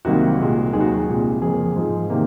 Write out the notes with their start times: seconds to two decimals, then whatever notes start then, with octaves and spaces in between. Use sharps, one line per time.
0.05 C2 C3 D#3 F#3 A#3 F#4
0.39 C2 A#2 G#3
0.73 D#2 D#3 F#3 G#4
0.81 F#4
0.88 G#4
1.07 C2 A#2 G#3
1.42 F2 C#3 F3 A#3 G#4
1.76 G#2 F3 G#3
2.10 C3 D#3 A#3